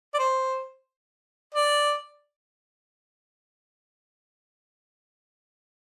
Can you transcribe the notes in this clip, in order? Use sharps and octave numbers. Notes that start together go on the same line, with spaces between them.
D5
C5
D5